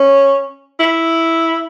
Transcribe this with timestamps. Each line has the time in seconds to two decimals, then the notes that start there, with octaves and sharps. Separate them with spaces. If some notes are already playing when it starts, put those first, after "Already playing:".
Already playing: C#4
0.80 E4